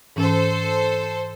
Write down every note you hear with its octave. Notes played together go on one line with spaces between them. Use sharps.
G#2 E3 C#4 A4 C5